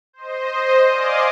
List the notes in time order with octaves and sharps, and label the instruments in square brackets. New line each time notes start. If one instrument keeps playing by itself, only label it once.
[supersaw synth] C5 D#5
D5 D#5 F5 G#5 C6 D6